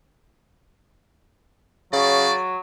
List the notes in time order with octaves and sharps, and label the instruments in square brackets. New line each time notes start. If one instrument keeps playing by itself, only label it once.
[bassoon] C#3 [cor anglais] F#3 [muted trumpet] D5